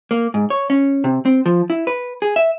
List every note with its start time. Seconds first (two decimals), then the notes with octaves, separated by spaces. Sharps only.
0.11 A#3
0.34 G#2
0.50 C#5
0.70 C#4
1.04 C3
1.25 C4
1.46 F3
1.70 E4
1.87 B4
2.22 G#4
2.36 E5